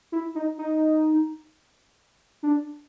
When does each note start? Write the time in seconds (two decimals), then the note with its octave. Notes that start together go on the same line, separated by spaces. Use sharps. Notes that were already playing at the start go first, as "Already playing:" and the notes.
0.12 E4
0.35 D#4
0.58 D#4
2.43 D4